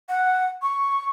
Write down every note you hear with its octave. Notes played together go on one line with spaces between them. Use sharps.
F#5
C#6